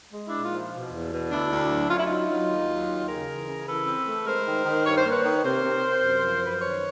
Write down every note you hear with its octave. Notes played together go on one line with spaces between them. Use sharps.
G#3
D4 E4
A#2
D#4 F4
F3
B2
E2
B2
D2 D4 E4
D2
F#3
C#4 F4
E4
F#3 D#4 F4
F#3
D#2
F#3
D#2
C#3 G#4 A#4
E3
C#3
E3 A4 B4
C4
A3
G#3 A#4 C5
D#3
D#3
G2 C#5
C5
A#3
B4 C#5
D#3
C3 A#4 C5
C3
C3
F#2
F3
F#2 B4
C5
D#3 B4 C#5